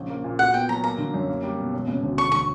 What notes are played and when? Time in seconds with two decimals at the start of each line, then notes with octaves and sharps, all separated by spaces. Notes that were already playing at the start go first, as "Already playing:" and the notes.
Already playing: A#1 C#3
0.10 A#3
0.24 A#2
0.39 F#4 F#5
0.53 B3 G5
0.69 F#3 A#5
0.84 A#3 A#5
0.98 D3
1.14 F#2
1.29 A#3
1.43 G3
1.58 B2
1.74 E1
1.88 C#3
2.03 D2
2.17 E1 C#6
2.32 D3 C#6